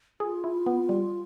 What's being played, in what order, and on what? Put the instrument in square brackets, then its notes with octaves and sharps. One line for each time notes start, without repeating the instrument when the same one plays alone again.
[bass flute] F4 [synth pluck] G#4
[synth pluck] E4
B3
G3